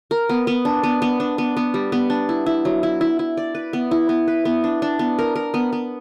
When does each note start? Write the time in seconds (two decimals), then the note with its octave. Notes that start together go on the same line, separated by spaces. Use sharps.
0.11 A#4
0.29 B3
0.47 B3
0.65 D4
0.83 B3
1.02 B3
1.20 D4
1.38 B3
1.57 B3
1.74 G3
1.92 B3
2.10 D4
2.29 E4
2.46 E4
2.65 F#3
2.83 E4
3.01 E4
3.19 E4
3.37 D5
3.55 B4
3.73 B3
3.91 E4
4.09 B3
4.28 B4
4.45 B3
4.64 D4
4.82 D4
4.99 B3
5.19 A#4
5.35 A#4
5.54 B3
5.72 B3